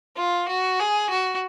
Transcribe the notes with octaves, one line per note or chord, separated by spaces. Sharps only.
F4
F#4
G#4
F#4